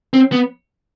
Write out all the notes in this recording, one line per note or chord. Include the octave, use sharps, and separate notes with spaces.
C4
B3